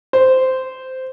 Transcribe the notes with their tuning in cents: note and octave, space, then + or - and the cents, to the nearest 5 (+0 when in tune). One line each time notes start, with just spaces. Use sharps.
C5 -10